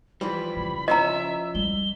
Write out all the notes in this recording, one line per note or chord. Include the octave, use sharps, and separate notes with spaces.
E3 F3 G3 B5
C#3
F3 C#4 E4 D#5 E5 A#5
G3 G7